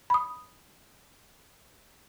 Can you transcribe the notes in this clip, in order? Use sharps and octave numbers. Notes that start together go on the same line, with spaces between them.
B5 D#6